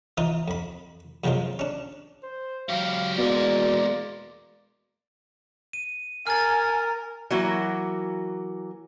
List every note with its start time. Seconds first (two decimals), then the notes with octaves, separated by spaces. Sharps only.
0.18 E3 D#4 F4 D#6
0.48 F2 B5
1.24 F#2 C3 F3 F#3 G#3 F4
1.59 C#4 D4
2.23 C5
2.69 F#3 G4 F5
3.18 E2 B2 G#3 A#3 D5
5.73 D#7
6.27 A#4 G#5 F6 A6
7.30 E3 F#3 A#3 F#4